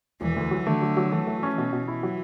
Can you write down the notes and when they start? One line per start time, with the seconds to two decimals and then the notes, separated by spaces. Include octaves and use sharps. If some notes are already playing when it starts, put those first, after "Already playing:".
0.21 E1 E3
0.36 D2
0.51 F#3
0.66 D3 A3
0.81 F#3
0.97 F#3
1.11 E3 A3
1.27 A3
1.43 C#4
1.57 B2 E3
1.73 B2
1.88 E4
2.03 F#3